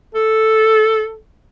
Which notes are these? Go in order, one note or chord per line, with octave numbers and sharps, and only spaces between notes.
A4